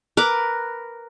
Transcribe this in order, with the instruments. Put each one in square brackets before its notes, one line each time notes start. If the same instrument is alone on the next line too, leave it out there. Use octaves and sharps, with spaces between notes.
[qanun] A#4 B4 D6